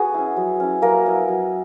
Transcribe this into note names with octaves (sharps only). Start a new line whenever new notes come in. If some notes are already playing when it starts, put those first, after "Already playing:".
Already playing: B3 F#4 G#4 F#5
C#4 E4
F#3
C#4 E4
F#3 A#3 A#4
B3 E4
F#3